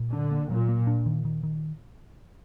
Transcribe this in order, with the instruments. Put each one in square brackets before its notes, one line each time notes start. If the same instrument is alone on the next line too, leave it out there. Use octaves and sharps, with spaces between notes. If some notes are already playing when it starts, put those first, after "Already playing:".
Already playing: [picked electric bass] A#2
[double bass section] D3 [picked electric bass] D4
[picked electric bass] A#3
[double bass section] A#2 [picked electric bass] F#3
[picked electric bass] A#3
D4
D#3
D#3
D#3